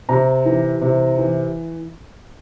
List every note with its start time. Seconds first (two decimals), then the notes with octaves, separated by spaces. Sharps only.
0.09 C3 A#5
0.45 E3
0.81 C3
1.18 E3